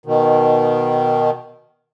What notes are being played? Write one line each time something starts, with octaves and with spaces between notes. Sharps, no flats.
B2 D#3